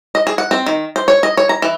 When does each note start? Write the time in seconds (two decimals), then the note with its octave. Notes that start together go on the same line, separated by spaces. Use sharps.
0.15 D#5
0.27 G#4
0.38 F#5
0.51 C4
0.66 D#3
0.96 C5
1.08 C#5
1.23 D#5
1.37 C#5
1.49 A#5
1.62 E3